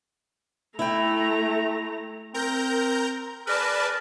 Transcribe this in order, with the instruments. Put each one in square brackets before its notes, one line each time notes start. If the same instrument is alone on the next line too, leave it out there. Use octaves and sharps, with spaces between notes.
[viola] A3 A#5 [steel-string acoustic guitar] E4 G5
[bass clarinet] C4 [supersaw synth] A#4 A#5 G6
[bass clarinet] G#4 [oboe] A#4 [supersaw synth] B4 D5 A5